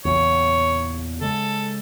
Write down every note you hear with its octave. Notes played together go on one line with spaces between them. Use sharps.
E2 A#2 C#3 C#5
C#3 G#3 A4